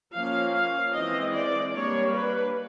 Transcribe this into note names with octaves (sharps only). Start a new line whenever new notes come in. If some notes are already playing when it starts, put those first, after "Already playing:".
F3 A#3 C#4 F5
F5
E3 G#3 C4 D#5
D5
G3 A#3 D4 C#5
B4